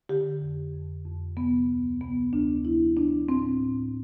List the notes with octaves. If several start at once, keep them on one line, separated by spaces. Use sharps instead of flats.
D3 G4
F2
F2
F2
C3 B3
D2
C3 B3
D2 D4
F3 E4
F3 D4
A2 C4
A2